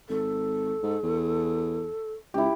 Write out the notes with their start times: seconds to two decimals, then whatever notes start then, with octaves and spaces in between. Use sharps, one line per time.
0.09 G#1 A4
0.83 G#2
1.03 E2
2.34 C#2 E4 G4